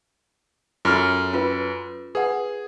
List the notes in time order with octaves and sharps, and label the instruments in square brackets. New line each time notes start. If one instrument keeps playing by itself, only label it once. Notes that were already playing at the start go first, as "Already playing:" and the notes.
[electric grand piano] F#2 F6 [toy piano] F4 A4
[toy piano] C#4 F4 B4
[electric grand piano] G#4 [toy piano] B4 F#5